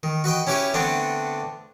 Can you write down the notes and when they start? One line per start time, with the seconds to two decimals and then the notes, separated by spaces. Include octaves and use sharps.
0.03 D#3
0.24 F#4 B4 D#5 G5
0.47 C#4 E4 G4 B4 C#5
0.74 D3 A3 B3 C4 D4